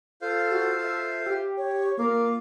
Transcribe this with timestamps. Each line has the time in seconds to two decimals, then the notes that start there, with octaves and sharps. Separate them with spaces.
0.22 F4 A4 C5 F5
0.51 F#4
0.84 E5
1.26 G4
1.57 C#5
1.99 A#3 F4 A#4 F5 D6